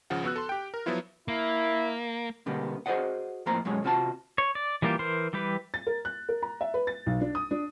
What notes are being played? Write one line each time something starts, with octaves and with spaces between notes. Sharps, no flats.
G#1 C#3 F3 F#5
B3 F#4 E6 F#6
A4 C6
G4 G5
A#4
F3 F#3 B3 E4 F4
A#3 E4
B2 D3 G3 A#3 B3
F#4 G#4 C5 D5 D#5 F#5
F2 A2 A#3 C5 A#5
F#2 B2 G#3 C#5
C3 F4 F#4 B4 A5
C#5
D5
E3 G3 A#3 F4 G4
E3 A#4 C5 C6
E3 G3 G4 B4
A6
A#4
F#6
A#4
A#5
E5
B4
A6
B1
D4
D#6
D4